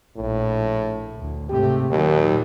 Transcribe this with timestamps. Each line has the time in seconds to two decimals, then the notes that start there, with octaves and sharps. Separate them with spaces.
0.17 A#1 A2
1.16 D2
1.49 G#2 C3 A3 G4
1.90 D#2 A#2 D#3 F#3